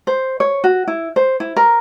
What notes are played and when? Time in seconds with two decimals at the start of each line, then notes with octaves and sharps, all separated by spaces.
0.07 C5
0.40 C#5
0.64 F#4
0.87 E4
1.16 C5
1.40 E4
1.56 A#4